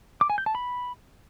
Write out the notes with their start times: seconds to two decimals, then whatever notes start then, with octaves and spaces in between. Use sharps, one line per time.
0.21 D6
0.30 G#5
0.38 G6
0.46 A5
0.55 B5